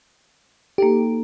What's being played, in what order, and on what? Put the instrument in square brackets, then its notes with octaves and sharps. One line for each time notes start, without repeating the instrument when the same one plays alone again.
[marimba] A#3 D#4 A4 [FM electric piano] G4